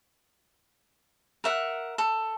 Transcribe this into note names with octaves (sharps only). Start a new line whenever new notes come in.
A#4 E5 F#5
A4